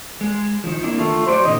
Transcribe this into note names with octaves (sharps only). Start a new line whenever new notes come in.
G#3
D#3 F3
A#3 D4 E4
D3 D#3 A3 F4
F#3 F#4 C5 D5
A#2 D3 E3 D#5